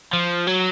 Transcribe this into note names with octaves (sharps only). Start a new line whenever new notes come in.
F3
F#3